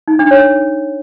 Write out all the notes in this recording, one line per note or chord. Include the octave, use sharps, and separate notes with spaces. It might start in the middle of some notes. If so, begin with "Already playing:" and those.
D#4
D4
C#5